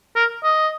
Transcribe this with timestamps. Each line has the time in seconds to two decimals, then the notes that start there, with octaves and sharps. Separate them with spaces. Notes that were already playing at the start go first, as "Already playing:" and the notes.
0.16 A#4
0.44 D#5